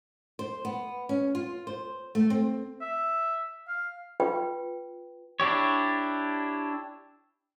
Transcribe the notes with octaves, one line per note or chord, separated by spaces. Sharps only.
C5
B3
C#4
F4
C5
A3
C4
E5
F5
F4 B4 G5
D4 E4 G4 C#5